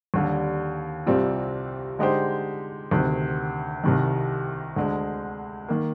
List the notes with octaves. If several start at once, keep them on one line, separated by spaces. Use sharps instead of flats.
D#2 D3 G3
C2 C3 G3 C4 F4
D3 G#3 D#4 G4 C5
D2 C3 D#3
C2 C3 D#3
D2 D3 G#3
D#3 A#3